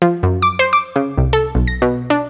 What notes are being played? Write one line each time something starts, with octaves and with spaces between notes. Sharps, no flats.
F3
F#2
D6
C5
D6
C#3
C2
A4
B1
A#6
B2
D4